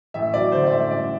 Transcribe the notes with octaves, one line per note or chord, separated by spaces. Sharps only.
A1 E5
F#3 D5
D3 C5
D5
A1 E5
G2 D5